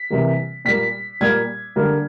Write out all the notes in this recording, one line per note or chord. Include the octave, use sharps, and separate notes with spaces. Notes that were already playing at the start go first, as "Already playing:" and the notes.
Already playing: B6
C3 E3 G3 A#3
A#2 G3 A#3 B6
A#2 G3 A#3 G#6
D3 G3 A#3